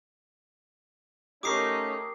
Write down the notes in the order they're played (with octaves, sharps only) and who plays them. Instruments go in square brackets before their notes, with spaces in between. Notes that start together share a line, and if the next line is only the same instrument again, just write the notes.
[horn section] A3 C#4 D#4 [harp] G4 A#4 [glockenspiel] D6 D#6 C7